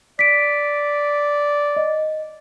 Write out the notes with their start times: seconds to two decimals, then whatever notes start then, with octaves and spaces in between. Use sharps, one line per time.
0.19 D5 B6 D7
1.76 D#5